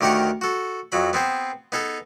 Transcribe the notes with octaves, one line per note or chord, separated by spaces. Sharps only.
D2 D#3 G4 A#4 F#5 C#6
F#4 A4
F2 F#3 B5
B3 C4 G#4 C5
B3 D#4 G#4 A4